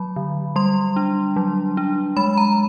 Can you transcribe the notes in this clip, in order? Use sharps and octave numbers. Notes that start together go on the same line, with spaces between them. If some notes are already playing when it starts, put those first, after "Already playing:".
Already playing: F#3 B5
D3
G3 C6
D4
F#3
D4
G#3 B5
A#5